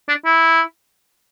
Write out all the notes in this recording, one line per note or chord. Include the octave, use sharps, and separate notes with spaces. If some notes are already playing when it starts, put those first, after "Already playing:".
D4
E4